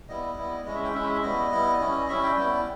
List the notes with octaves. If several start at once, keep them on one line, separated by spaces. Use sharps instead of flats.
G3 B3 E4 D#5
G3 B3 E4
G#3 C#4 E4 D#5
E5
G5
G#3 C#4 E4 E5
E5
G3 B3 E4 D#5
G3 B3 E4
G3 C#4 E4
G3 C#4 E4 E5
G5
G3 B3 E4